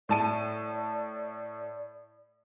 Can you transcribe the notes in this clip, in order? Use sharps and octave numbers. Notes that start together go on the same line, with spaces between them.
A2 D5 A5 D#7